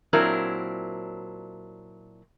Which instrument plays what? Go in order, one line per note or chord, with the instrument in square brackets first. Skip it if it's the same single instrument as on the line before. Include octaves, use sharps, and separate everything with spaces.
[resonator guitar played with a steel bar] A#2 F#3 C4 D4 E4 A#4